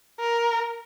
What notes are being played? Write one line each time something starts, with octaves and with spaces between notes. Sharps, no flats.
A#4